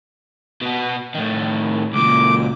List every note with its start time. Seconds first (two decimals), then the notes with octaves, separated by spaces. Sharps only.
0.61 B2 B3
1.14 A2 D#3
1.93 C#2 A#2 D6